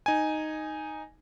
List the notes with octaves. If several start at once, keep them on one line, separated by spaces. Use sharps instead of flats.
D#4 G#5